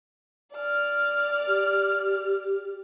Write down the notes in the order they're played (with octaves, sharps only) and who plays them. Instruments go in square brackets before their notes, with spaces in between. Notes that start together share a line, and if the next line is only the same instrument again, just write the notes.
[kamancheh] D5 F6
[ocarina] G4